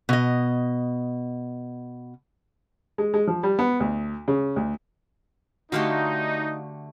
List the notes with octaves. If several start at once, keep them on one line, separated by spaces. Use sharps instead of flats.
B2 D#5
G#3
G#3
F3
G3
B3
D2
C#3
D2
D3 A3 D#4 F#4 G4 F5 C6